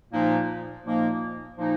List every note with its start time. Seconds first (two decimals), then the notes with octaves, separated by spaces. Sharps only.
0.11 A#2 F3 A#3 D#4
0.84 A#2 F3 A#3 D#4
1.56 A#2 F3 A#3 D#4